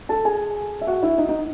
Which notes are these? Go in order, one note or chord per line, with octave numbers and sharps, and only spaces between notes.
A4 A5
G#4 G#5
E5
F#4 F#5
E4 E5
D#4 D#5
D#4 D#5